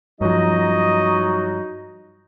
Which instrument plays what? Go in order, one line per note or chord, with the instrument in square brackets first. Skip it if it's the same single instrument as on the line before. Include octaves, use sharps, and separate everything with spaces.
[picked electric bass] G2 F3 [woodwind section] F#3 D#4 F#4 [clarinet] D#5